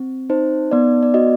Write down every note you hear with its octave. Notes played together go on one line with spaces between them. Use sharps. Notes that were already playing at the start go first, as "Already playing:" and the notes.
Already playing: C4
D#4 C5
B3 D5
D5
F#4 D#5